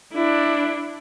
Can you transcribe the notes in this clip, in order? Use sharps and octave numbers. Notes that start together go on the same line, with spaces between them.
D4 E4